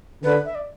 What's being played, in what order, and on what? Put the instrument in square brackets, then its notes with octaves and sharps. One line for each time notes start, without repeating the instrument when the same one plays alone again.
[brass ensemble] D3 [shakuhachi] B4
[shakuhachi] E5
D5